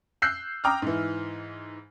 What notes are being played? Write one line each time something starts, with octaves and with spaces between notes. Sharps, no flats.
E6 F#6 G6 C7
G5 A#5 D6 D#6 F6
G#2 E3